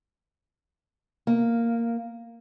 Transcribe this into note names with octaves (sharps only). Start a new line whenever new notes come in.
A#3